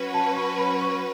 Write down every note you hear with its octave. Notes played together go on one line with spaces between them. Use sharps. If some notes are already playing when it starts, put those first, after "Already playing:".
Already playing: F#3 C#4 F#4 B4
A5
C#6
B5
C#6